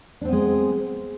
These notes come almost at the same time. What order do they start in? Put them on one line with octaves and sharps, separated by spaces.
D4 C4 B3 G#3